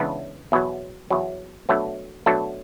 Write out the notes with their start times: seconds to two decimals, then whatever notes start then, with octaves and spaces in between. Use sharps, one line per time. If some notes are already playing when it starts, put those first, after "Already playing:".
Already playing: C#2 C#3 E3 B3 D4
0.52 E2 B2 F#3
1.10 E2 B2 F#3
1.69 B2 F#3 A3 D4 A4
2.26 B2 F#3 A3 D4 A4